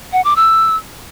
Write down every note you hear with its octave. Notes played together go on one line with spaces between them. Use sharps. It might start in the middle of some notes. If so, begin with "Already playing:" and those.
F#5
D6
E6